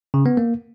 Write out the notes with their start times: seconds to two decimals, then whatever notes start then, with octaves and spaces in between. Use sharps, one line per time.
0.14 C#3
0.26 B3
0.37 A#3